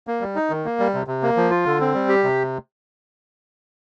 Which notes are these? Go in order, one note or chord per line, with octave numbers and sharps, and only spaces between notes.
A#3
G3
D#4
D#3
A#3
G3
C3
C3
A#3
F3
F4
D3
C4
G3
G4
C3